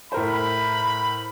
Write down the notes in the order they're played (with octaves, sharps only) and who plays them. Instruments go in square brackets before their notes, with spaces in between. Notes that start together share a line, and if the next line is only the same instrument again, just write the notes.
[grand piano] A2 A#4 C5 [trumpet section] B5